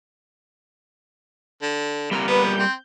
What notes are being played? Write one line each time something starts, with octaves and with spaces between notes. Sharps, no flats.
D3
C3 G3 A#3 A#5
B3 B4
G6
C4